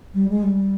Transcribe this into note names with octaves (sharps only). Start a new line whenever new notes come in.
G3
G#3
G3